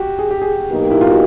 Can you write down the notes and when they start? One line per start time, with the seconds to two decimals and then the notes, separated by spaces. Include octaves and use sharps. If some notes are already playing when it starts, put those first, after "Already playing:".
Already playing: F#4 G4
0.19 G#4
0.31 G4
0.42 G#4
0.70 B2 F#3 A#3 D#4 G4
0.91 E4
1.01 F4
1.11 F#4